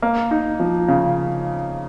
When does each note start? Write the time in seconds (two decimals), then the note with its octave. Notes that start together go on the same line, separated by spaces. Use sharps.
0.02 A#3
0.31 D#4
0.60 F3
0.88 C#3